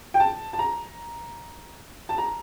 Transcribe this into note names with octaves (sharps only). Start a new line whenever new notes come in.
G5
A5
A5
A#5
A5
A#5